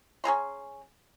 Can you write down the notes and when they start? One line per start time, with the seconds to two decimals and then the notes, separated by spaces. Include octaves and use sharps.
0.24 C#4 G#4 A#5 C6